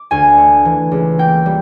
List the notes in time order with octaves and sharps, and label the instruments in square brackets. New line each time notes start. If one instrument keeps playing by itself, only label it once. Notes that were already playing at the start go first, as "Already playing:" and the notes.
Already playing: [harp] D6
D2 G#5
A3
E3
C#2
A#3 G5
G3